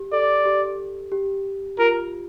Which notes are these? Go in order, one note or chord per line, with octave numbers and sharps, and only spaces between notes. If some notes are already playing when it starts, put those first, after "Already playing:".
Already playing: G4
A4 D5
G4
G4
F4 A#4